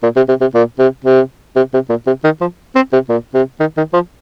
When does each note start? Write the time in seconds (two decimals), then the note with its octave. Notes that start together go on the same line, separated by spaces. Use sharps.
0.03 A#2
0.16 C3
0.29 C3
0.41 C3
0.54 A#2
0.79 C3
1.04 C3
1.56 C3
1.74 C3
1.89 A#2
2.07 C3
2.24 D#3
2.41 F3
2.75 C4
2.93 C3
3.09 A#2
3.34 C3
3.60 D#3
3.77 D#3
3.93 F3